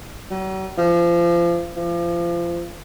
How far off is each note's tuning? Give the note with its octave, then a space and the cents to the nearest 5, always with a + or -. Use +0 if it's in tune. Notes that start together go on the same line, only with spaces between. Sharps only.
F#3 +45
F3 -30
F3 -30